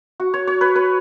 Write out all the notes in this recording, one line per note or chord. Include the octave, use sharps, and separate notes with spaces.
F#4
C#5
C#5
B4
B4